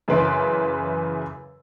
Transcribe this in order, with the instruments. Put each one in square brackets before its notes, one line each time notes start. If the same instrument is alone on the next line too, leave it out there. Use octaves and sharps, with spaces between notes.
[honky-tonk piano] F#2 C#3 E3 B4 C6 D7